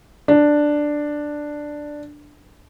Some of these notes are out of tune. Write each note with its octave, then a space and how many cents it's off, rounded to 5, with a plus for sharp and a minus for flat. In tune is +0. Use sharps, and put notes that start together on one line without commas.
D4 +5